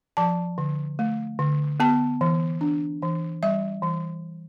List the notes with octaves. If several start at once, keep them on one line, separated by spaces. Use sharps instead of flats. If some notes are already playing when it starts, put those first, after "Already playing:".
F3 A5
D3
A3
D3
B3 A5
E3
D4
E3
G3 E5
E3